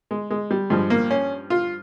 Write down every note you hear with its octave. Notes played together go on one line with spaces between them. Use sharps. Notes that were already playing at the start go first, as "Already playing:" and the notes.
G#3
G#3
G3
G2 F3 G#3
A#3
C#4
F4